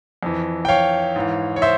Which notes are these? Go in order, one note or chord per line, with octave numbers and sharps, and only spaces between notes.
F2 E3
G5
C#5 F5
G#2 E3
C#5
C5 E5